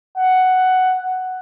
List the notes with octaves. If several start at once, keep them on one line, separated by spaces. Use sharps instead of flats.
F#5